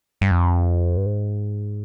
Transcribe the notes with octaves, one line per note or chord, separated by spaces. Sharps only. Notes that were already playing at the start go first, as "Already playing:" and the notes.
G2
F2
G2
G#2